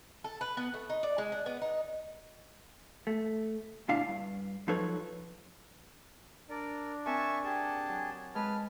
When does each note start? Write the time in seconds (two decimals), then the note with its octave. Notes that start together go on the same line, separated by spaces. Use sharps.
0.24 A4
0.41 B4
0.57 B3
0.74 A3
0.89 D#4
1.03 D5
1.18 G#3
1.32 D4
1.46 B3
1.62 D#4
3.07 A3
3.88 D2 A#2 D4 E4 F5 A5
4.08 G2
4.68 F3 F#3 D#4 A4 B4 C#5
6.50 D4 A#4 D5
7.06 C4 A#4 E5 G#5 A5 C#6
7.44 G4 G#4 A5
7.89 F#3
8.35 G#3 B4 A5 F6